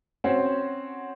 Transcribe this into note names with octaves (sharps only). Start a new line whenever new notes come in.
C4 C#4 F#4 C5